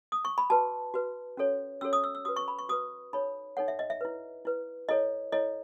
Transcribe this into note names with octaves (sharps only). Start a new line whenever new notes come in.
D#6
C#6
B5
F#4 B4 A5
F#4 B4
C#4 F#4 A4 C#5
C#4 F#4 A4 C#5 E6
D#6
E6
E6
F#4 B4 D#6
C#6
B5
C#6
F#4 B4 D#6
D#4 A4 C#5 B5
D#4 A4 C#5 F#5
E5
D#5
E5
E4 B4
E4 B4
E4 A4 C#5 D#5
E4 A4 C#5 D#5